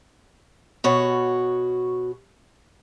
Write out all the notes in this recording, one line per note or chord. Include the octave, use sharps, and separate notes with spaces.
B2 F#4 C#5